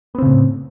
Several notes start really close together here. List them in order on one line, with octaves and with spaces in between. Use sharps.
B3 C4 C#3 A2